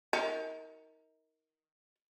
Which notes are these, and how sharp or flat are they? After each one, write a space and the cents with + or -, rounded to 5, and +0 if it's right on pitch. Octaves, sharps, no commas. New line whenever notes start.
D#4 +35 A#4 +0